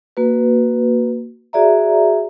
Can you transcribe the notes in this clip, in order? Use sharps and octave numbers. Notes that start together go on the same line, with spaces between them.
A#3 F#4 B4
F#4 G#4 D5 E5 A#5